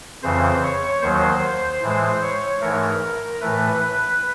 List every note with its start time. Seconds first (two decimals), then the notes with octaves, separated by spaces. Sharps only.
0.23 F2 C#3 E3 C5
0.63 C#5
1.02 D#2 D#3 F#3 C5
1.82 A2 E3 G#3
2.22 C#5
2.61 G#2 E3 A3 A#4
3.41 A2 E3 A3 B4
3.81 B4